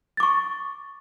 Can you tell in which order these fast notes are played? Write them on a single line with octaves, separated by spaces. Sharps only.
A6 D6 C#6